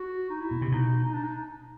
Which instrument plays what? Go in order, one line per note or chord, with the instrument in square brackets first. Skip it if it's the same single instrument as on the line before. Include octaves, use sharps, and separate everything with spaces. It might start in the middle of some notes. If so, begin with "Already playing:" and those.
Already playing: [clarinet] F#4
D#4
E4
[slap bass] B2
C3
[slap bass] B2 [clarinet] D#4
[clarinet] D#4
D4
D#4